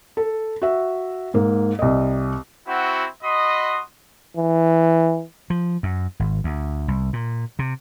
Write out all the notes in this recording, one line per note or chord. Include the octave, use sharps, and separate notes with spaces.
A4
F#4 E5
G#2 A#3
C2 D#5
C4 E4 F#4
F#4 D#5 B5 C6 D#6
E3
F3
F#2
G#1
D2
C2
A#2
C3